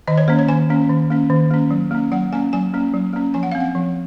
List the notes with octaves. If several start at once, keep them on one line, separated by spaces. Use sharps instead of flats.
D#3 D#5
C#5
A#3 C#4 C5
C#5
D#3 G#5
A#3 C#4
D#3
A#3 C#4
D#3
A#3 C#4
F#3
A#3 C#4
F#3 F#5
A#3 C#4 G#5
F#3 G#5
A#3 C#4
F#3
A#3 C#4
F3 G#5
F#5
C4 F5
F#5
F3